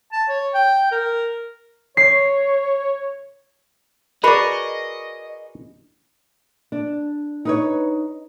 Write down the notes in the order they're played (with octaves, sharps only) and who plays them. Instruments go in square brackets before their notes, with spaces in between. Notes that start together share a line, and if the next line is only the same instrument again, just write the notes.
[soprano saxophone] A5
C#5
G5
A#4
[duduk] C#5 [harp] C7
[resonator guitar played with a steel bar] F#4 G#4 A#4 [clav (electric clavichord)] B4 D5 [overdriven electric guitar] D#5 [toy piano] B5
[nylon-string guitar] D4
D#4 B4 C#5